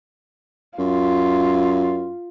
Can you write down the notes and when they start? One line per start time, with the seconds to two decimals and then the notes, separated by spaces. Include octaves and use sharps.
0.79 F#2 F4